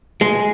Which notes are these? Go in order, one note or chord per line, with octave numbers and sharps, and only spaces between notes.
G#3